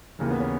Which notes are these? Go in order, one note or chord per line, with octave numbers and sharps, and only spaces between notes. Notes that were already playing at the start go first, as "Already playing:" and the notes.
D#2 C#3 E3 A#3
B3
C#4